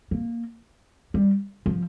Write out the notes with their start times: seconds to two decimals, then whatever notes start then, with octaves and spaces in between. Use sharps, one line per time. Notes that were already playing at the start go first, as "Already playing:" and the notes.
0.11 A#3
1.14 G3
1.66 F3